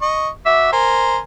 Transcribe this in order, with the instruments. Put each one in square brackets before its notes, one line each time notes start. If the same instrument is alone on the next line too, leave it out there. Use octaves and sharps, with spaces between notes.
[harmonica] D#5 C#6
[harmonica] F#4 D6 [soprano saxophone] E5
[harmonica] A#4 G#5 [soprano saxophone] C5